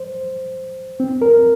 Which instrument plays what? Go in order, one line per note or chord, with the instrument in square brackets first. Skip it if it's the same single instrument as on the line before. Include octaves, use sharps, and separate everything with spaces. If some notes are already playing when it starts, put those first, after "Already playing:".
Already playing: [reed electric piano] C5
C4
A#4